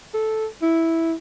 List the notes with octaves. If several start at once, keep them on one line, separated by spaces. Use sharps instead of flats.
A4
E4